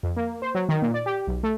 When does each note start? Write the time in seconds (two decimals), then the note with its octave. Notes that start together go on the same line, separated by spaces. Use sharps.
0.03 F2
0.17 A#3
0.42 C5
0.55 F#3
0.69 D#3
0.82 A#2
0.94 D5
1.06 G4
1.27 B1
1.43 A3